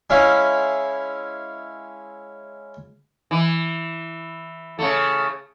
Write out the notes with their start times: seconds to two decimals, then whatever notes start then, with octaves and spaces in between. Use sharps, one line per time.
0.10 G#3 C#4 E4 F5
3.31 E3
4.79 C#3 A3